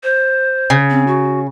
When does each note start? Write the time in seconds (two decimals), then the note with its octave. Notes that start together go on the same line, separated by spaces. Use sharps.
0.03 C5
0.70 C#3
0.90 C4
1.07 F#4